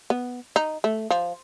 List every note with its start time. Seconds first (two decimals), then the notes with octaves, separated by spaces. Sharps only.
0.10 B3
0.56 D#4
0.84 A3
1.10 F3